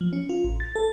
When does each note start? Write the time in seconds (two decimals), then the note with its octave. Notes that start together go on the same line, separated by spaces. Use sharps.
0.01 F3
0.13 C#4
0.29 F4
0.44 A1
0.60 A6
0.76 A4